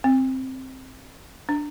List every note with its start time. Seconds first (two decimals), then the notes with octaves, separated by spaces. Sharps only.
0.04 C4
1.49 D4